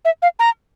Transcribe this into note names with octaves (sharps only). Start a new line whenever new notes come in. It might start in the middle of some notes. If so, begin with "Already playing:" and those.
E5
F5
A#5